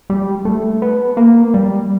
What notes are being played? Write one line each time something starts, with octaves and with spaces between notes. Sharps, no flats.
G3
A3
B3
A#3
G3